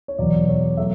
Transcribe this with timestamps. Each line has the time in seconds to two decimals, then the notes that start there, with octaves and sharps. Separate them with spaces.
0.08 C#5
0.18 E2 B2 F#3 D5
0.49 C#5
0.77 F#3 A3 E5